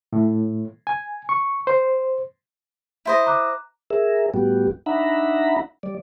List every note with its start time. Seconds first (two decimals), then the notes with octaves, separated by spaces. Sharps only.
0.13 A2
0.87 G#5
1.29 C#6
1.67 C5
3.05 E4 C5 D#5
3.26 A#5 D6 F#6
3.90 G#4 A#4 E5
4.34 A2 G3 B3 F#4 G4
4.86 D4 D#4 E5 F#5 A#5 B5
5.83 G3 D5